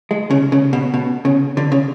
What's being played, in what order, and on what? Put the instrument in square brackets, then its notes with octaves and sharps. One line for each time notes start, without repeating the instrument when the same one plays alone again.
[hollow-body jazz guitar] G#3
C#3
C#3
B2
B2
C#3
D3
C#3